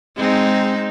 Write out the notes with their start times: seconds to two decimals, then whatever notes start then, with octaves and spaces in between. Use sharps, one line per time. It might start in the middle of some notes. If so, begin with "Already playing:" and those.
0.16 G#3 C4 D#4